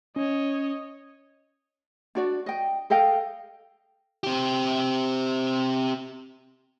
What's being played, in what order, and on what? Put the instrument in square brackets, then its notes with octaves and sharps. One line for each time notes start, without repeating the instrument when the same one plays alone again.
[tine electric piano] C#4 [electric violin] C#5 D#5
[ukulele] D4 F#4 D5
D#5 G5
A4 D#5 F5 G5
[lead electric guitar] C4 G4